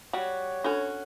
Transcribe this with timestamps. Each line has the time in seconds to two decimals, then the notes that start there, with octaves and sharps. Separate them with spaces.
0.13 G3 F#4 C#5
0.64 C#4 D4 F#4 A4 B5